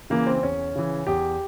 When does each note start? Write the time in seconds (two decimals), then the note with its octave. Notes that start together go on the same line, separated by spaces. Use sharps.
0.10 C#3 E3 A#3
0.27 C4
0.43 E2 C#4
0.75 C#3 E3
1.07 E2 G4